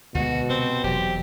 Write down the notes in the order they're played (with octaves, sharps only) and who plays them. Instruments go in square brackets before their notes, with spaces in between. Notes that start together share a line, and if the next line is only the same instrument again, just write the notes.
[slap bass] D2 G#3 [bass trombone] B2 [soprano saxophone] F#4
[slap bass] C3 [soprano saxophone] C4
[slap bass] E1 F#3 [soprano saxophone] G4